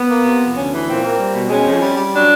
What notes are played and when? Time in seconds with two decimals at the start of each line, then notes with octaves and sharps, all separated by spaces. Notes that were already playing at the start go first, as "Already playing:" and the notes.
Already playing: B3
0.08 A#3
0.24 C3
0.40 F2
0.55 D2 C#4
0.71 E3
0.87 A#2 C4
1.02 A#3
1.18 G3
1.34 B2
1.49 G#3 C#4
1.66 F2
1.82 G3
1.97 G3
2.12 F#3 D4